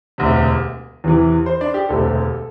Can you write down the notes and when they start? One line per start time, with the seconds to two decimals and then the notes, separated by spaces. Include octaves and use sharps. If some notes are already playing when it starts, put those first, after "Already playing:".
0.18 E1 D2 C3
1.04 E2 C3 E3
1.46 C5 C6
1.61 D4 D5
1.74 G4
1.89 E1 D2 C3 A4